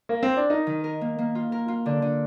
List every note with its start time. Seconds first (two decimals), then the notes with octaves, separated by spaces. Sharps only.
0.09 A#3
0.23 C4
0.37 D4
0.50 D#4 A#4
0.67 D#3
0.84 A#4
1.01 A#3
1.18 A#3
1.35 F4
1.52 A#4
1.68 F4
1.86 D3 D4
2.02 D3